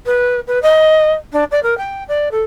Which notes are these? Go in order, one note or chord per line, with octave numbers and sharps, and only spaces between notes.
B4
B4
D#5
D4
D5
A#4
G5
D5
A4